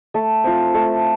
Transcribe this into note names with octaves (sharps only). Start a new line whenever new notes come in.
A3 A4
C4 F4
A3 A4